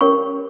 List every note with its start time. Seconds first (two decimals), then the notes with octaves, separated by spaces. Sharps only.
0.01 C#4 G4 A#4 C#5 C#6